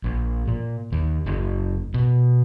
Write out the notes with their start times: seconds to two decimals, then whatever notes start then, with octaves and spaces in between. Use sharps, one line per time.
0.04 A#1
0.47 A#2
0.92 D#2
1.26 F#1
1.94 B2